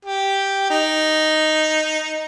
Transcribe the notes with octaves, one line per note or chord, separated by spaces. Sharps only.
G4
D#4